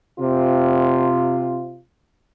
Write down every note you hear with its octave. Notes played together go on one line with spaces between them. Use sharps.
C3 F4